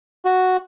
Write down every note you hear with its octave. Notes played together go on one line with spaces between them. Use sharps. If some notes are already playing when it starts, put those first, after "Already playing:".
F#4